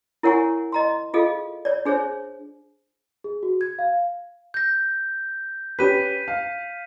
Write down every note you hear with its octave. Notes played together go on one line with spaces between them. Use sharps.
E4 A#4 C#5 F#5 G#5 C#6
D#5 A#5 C6
F4 G#4 A4 D#5 F5
C#5 D5
D4 G#4 C5 C#5
G#4
F#4
G#6
F5
G6 A#6
C#4 G4 B4 B6 D#7
F5